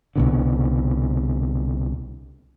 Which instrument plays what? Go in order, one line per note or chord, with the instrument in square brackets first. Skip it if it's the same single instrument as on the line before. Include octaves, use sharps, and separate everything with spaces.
[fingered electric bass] C2 B2 D3